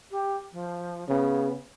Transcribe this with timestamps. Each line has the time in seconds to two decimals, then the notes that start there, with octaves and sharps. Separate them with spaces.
0.11 G4
0.52 F3
1.09 C#3 B3